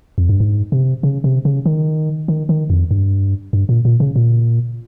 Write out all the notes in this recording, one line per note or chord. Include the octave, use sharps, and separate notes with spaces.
F2
G2
G#2
C3
C#3
C3
C#3
D#3
D#3
D#3
F2
G2
G2
A#2
A#2
C#3
A#2